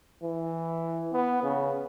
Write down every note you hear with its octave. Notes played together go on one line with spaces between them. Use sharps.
E3
B3
C#3